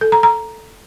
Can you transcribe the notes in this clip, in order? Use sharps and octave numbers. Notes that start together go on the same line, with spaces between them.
A4
A#5
A#5